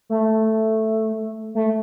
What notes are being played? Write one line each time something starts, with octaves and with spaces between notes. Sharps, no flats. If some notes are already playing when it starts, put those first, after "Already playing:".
A3
A3